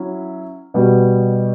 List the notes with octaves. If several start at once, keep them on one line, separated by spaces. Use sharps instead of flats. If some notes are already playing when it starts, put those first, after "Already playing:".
Already playing: F#3 C#4 E4
B2 G3 B3 F#4